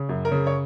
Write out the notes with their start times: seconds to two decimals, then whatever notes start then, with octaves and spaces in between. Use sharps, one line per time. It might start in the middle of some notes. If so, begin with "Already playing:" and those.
Already playing: C#3
0.09 F#2
0.25 A#4
0.32 C#3
0.47 C#5